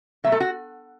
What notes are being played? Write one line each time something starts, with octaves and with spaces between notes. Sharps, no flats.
B2 F#3 A3 E5
A4
F#4